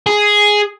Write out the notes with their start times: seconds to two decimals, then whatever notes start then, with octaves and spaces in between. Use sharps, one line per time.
0.07 G#4